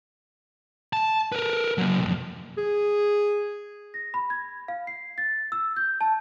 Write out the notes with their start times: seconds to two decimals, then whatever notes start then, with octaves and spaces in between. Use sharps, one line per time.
0.93 A5
1.32 A#4 B4
1.78 F#3 A#3
1.99 B1 F2
2.58 G#4
3.94 A#6
4.14 B5
4.30 G#6
4.68 F5
4.87 C7
5.18 A6
5.52 E6
5.76 G6
6.01 A5